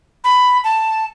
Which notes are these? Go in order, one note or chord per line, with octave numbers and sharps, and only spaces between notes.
B5
A5